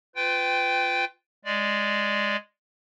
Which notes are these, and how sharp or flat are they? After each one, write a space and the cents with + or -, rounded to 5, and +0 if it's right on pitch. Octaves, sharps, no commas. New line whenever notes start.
F4 +0 B4 +35 G5 +0
G#3 +0 D5 +0